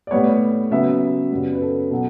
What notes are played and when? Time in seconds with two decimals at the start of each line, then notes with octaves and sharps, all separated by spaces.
0.07 D5
0.11 A2 G3 B3 C#5
0.71 C#3 F#3 B3 E5
1.32 F#2 C#3 G3 B3
1.55 B4
1.61 A4
1.91 B2 F#3